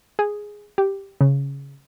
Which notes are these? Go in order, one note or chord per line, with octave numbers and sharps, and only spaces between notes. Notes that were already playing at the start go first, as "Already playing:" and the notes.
G#4
G4
C#3